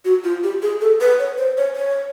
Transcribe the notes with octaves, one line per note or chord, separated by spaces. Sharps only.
F#4
F4
G4
G#4
A4
B4
C#5
C5
C#5
C#5